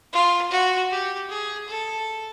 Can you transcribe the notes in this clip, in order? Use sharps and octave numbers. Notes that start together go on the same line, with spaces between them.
F4
F#4
G4
G#4
A4